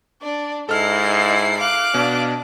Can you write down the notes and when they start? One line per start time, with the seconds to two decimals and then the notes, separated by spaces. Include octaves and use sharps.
0.22 D4 D5
0.69 G#2 E4 A4 D#5 F6 C7
1.60 F5 D6 F#6
1.94 B2 D4